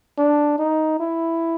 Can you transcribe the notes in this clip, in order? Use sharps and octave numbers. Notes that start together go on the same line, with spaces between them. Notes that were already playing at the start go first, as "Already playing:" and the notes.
D4
D#4
E4